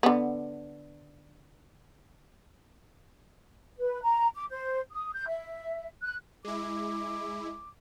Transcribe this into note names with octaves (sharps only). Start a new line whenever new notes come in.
D3 B3
B4
A#5
D6
C5
D#6
G6
E5
F#6
G#3 E4 D6